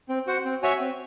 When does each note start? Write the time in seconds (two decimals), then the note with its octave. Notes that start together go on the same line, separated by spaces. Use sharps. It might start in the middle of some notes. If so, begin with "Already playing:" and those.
0.09 C4
0.27 F#4 C5 F#5
0.45 C4
0.62 F#4 C#5 E5 G#5
0.80 C4